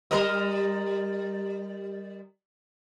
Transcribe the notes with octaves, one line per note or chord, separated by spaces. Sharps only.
G3 A#4 D#5